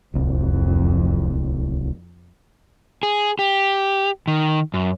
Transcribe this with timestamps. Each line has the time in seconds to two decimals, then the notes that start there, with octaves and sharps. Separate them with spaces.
0.14 D1 C2 F2
3.03 G#4
3.39 G4
4.28 D#3
4.74 F#2